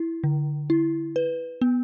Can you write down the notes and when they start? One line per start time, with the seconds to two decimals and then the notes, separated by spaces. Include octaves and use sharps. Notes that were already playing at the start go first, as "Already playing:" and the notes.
Already playing: E4
0.24 D3
0.70 E4
1.16 B4
1.61 B3